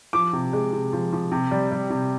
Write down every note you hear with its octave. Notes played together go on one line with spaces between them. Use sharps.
F3 D6
C3
G#3
C3
F3
F3
C3
G3
G3
C3